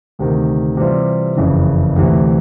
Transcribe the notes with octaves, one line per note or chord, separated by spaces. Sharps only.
D2 C3 D#3
C3 E3 G3 C4 F4
F#1 F2 C#3 E3
D2 C3 E3